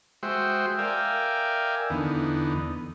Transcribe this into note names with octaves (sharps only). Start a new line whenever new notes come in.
G#3 F#4 C5 E5 G5
A#4 D5 E5 F5 G5 G#5
E2 D3 B3 D#4